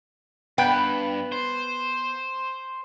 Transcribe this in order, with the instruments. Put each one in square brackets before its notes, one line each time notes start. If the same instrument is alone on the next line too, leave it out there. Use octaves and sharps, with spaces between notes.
[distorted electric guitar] G2 [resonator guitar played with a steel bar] B3 B4 G5
[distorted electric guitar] C5